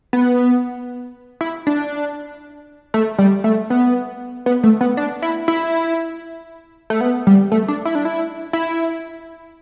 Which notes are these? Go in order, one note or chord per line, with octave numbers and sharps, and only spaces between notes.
B3
E4
D4
A3
G3
A3
B3
B3
A3
B3
D4
E4
E4
A3
B3
G3
A3
D4
E4
D4
E4
E4